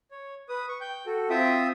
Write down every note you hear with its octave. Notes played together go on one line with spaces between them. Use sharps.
C#5
B4 D#6
C#6
G5 G6
F#4 A4
C4 F4 E5 G5 D#6